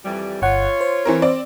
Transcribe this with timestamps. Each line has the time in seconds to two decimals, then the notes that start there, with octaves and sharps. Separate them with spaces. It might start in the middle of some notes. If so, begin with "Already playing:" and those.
0.04 F2 E3 G3
0.42 G1 F4 C#5 F#5
0.81 C5
1.05 E3 C4 A#4
1.22 C4 D5